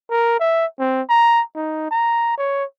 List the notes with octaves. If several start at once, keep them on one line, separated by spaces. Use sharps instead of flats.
A#4
E5
C4
A#5
D#4
A#5
C#5